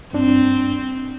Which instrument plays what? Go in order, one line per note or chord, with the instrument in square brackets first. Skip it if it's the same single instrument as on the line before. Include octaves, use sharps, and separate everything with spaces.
[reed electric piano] G2 D4 [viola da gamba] C4